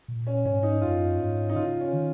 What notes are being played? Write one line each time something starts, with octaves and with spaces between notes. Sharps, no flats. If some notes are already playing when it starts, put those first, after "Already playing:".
A#2
C#4
G#2 C#4
D#4
F#2 F4
G#2
D#4
C#3 F4
C#4
D#3